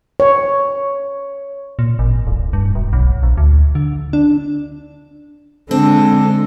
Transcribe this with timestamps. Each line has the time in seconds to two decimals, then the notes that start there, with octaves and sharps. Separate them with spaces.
0.20 C#5
1.79 A#2
1.99 G#1
2.27 D1
2.53 G2
2.75 E1
2.93 B1
3.23 A#1
3.38 D2
3.75 D3
4.13 D4
5.71 D3 G#3 C4 D4 A4